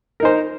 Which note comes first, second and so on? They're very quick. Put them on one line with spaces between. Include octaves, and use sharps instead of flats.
A#4 D#4 C5